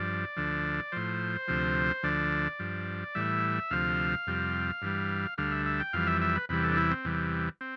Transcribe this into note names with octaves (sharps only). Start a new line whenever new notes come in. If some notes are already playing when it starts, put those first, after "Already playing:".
Already playing: G2 F3 D5
D2 D3 F3
A2 F3 C5
D2 C3 F3
D2 D3 F3 D5
G2 F3
A2 E3 G3 E5
D2 C3 F3 F5
F2 C3 G3
G2 E3 G3
D2 D3 G3 F5
E5
E5
G5
F2 E3 G3 F5
E5
E5
B4
E2 C3 E3 G3 B4
A4
D4
E4
C4
E2 C3 E3 G3
C4